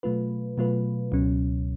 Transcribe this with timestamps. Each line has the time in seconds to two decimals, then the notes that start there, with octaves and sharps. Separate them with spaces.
0.03 B2 F#3 A3 F4 B4
0.58 B2 F#3 A3 F4 B4
1.12 C#2 B2 F#3 C#4